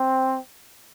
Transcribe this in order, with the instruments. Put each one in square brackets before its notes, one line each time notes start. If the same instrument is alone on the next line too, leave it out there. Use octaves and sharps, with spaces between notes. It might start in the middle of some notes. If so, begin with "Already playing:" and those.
Already playing: [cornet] C4